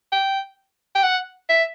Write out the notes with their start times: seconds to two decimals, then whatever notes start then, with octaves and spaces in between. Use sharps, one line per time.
0.12 G5
0.95 G5
1.03 F#5
1.49 E5